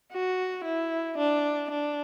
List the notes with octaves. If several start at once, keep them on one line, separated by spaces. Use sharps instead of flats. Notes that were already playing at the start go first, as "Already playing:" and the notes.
F#4
E4
D4
D4